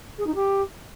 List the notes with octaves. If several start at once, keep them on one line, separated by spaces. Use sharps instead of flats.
G#4
D#4
G4